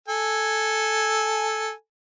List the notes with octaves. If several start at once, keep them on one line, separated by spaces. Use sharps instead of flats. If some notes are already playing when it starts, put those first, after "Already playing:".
A4 G#5